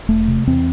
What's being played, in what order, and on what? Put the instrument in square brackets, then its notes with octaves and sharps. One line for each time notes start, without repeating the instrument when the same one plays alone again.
[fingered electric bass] E1 A3
C3
E2 C4